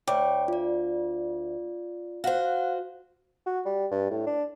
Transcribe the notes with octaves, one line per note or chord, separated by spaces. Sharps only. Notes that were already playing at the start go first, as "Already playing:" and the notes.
D2 C#5 G5 D6
F4 D5
F#4 C5 F5 F#5
F#4
G3
G2
A2
D4